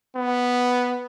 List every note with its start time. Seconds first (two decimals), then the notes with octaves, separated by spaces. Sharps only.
0.16 B3